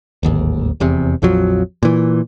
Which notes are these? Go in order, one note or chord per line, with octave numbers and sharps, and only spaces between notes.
D1 G#1 D#2
F1 E2 C3
A#1 F2 F3 F#3
A#2 E3